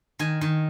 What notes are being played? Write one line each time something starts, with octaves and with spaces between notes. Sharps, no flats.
D#3 G#5
D#3